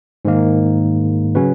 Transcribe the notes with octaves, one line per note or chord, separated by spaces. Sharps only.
G#2 D#3 A#3
C#3 F#3 C#4 F#4 B4